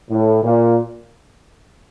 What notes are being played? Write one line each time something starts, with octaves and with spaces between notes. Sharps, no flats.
A2
A#2